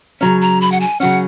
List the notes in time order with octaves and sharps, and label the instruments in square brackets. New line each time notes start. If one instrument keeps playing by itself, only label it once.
[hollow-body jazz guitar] C#3 F#3 C#4 [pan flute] A#5
[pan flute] A#5
B5
F#5
G#5
[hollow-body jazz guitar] C#3 F#3 C#4 [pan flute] F#5